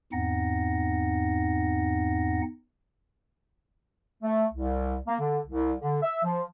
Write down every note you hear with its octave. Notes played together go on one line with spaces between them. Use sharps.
E2 G#2 C4 D#4 F#5 A#6
A3
C2
A#3
D3
C2
D3
E5
F3